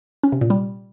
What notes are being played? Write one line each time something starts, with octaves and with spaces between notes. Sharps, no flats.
C#4
C3
A#2
G3